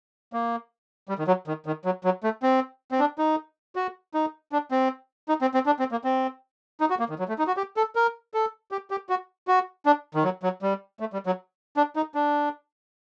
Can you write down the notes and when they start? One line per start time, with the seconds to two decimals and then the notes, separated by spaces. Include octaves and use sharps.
0.33 A#3
1.09 G3
1.19 D#3
1.27 F#3
1.47 D#3
1.66 D#3
1.85 F#3
2.04 F#3
2.24 A3
2.43 C4
2.92 C4
3.00 D4
3.18 D#4
3.76 F#4
4.14 D#4
4.52 D4
4.71 C4
5.29 D#4
5.41 C4
5.54 C4
5.66 D4
5.79 C4
5.92 A#3
6.04 C4
6.80 D#4
6.90 F#4
6.99 A#3
7.09 D#3
7.19 F#3
7.28 A3
7.39 D#4
7.47 F#4
7.57 G4
7.77 A4
7.96 A#4
8.34 A4
8.71 G4
8.91 G4
9.09 F#4
9.48 F#4
9.86 D4
10.15 D#3
10.24 F#3
10.43 F#3
10.62 G3
11.00 A3
11.13 G3
11.26 F#3
11.77 D4
11.96 D#4
12.15 D4